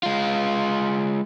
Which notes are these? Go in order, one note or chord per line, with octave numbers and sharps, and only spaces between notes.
G#3 F4